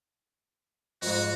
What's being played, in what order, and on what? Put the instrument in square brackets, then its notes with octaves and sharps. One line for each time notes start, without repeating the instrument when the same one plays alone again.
[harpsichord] F2 G#2 [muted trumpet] F#4